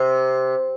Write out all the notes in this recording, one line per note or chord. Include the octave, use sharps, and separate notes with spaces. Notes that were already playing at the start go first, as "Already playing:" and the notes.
Already playing: C3